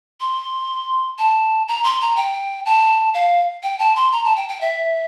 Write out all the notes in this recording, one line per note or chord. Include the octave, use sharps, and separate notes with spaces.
C6
A5
A#5
C6
A#5
G5
A5
F5
G5
A5
C6
A#5
A5
G5
G5
E5